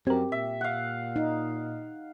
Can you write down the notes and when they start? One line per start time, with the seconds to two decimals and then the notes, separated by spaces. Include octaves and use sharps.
0.07 F#2 C4 G4 A#4
0.32 A#2 E5
0.61 F5 F#5
1.16 D#4